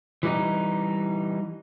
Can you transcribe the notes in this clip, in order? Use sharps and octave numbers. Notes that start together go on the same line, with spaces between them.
E3 G3 D#4